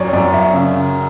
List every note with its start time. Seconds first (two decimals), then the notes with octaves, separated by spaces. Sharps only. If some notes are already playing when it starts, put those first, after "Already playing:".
Already playing: F#2 C#5 D5
0.13 F#2 D5
0.33 E5
0.53 C#3